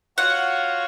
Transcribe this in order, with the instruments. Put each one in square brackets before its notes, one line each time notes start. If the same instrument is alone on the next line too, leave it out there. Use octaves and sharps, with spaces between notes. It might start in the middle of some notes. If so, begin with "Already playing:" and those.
[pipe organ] F4 F#4 C#5 [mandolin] F#5